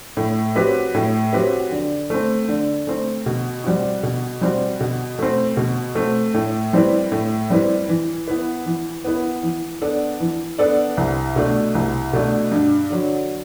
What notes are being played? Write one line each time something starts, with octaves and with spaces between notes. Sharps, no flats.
A2
F#3 C4 G4 B4
A2
F#3 C4 G4 B4
D3
A3 C4
D3
A3 C4
B2
G3 C4 F#4
B2
G3 C4 F#4
B2
A3 C4
B2
A3 C4
A2
G3 C4 E4 B4
A2
G3 C4 E4 B4
E3
B3 E4 B4
E3
B3 E4 B4
E3
B3 D4 A4 D5
E3
B3 D4 A4 D5
C2
B2 A3 D4
C2
B2 A3 D4
G2
D3 F#3